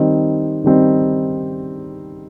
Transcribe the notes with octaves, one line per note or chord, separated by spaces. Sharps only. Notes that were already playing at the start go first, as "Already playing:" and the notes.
Already playing: D#3 G3 C4 D#4
D#3 G3 C4 D#4